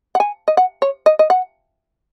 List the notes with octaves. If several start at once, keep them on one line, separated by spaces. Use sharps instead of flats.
F#5
G#5
D#5
F#5
C#5
D#5
D#5
F#5